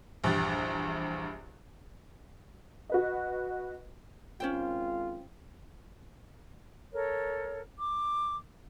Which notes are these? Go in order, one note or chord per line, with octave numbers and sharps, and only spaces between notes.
A#1 E2 G2 G4 F#6 A6
F#4 B4 D#5
G#1 C#4 F4 C5 G5
A4 A#4 C#5
D6